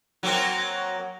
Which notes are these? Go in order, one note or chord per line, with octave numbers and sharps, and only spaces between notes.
F#3 A#3 C4